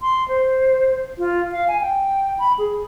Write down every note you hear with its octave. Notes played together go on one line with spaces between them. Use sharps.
C6
C5
F4
F5
G#5
G5
B5
G#4